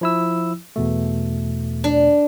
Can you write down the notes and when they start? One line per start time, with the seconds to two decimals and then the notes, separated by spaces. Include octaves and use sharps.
0.01 F3 E4 E6
0.76 E2 B2 A3
1.84 D4